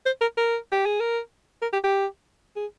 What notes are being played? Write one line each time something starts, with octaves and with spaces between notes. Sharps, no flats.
C5
A#4
A#4
G4
G#4
A#4
A#4
G4
G4
G#4